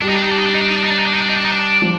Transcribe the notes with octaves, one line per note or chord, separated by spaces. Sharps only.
G3 D4
D#4
D4
D#4
D4
D#4
D4
D#4
D4
D#4
D4
D#4
D4
D#4
D4
D#4
D4
D#4
D4
D#4
D4
F3